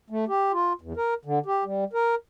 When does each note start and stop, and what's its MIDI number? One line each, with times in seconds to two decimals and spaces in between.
0.10 0.25 57
0.28 0.52 67
0.52 0.73 65
0.81 0.93 40
0.97 1.14 70
1.25 1.39 50
1.46 1.64 67
1.65 1.84 55
1.93 2.15 70